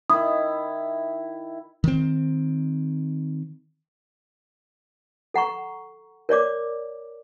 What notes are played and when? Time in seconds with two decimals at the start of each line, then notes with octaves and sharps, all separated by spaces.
0.10 D#3 E4 D#6
1.84 D#3 C4
5.34 A4 F#5 A#5 C#6
6.29 A#4 C#5 D5 D6